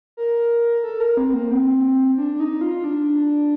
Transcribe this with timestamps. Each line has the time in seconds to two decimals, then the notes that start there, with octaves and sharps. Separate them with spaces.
0.17 A#4
0.83 A4
1.00 A#4
1.17 C4
1.34 A#3
1.51 C4
2.18 D4
2.34 D4
2.40 D#4
2.61 F4
2.84 D4